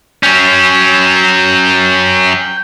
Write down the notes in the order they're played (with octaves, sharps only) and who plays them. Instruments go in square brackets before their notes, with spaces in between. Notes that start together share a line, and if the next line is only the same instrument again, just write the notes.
[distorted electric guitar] F#3 C#4 [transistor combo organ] G5